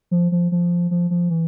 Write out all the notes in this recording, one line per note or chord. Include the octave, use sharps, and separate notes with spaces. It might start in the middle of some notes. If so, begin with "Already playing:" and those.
F3
F3
F3
F3
F3
E3